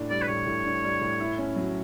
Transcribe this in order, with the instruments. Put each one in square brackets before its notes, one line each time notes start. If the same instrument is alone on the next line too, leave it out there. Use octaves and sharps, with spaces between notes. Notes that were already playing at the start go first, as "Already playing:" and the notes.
Already playing: [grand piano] A2 D4
[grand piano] G3 [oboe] D5
[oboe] B4
[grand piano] A2 [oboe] C#5
[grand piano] A2
D4
G3
A2
E4
C#4
F#3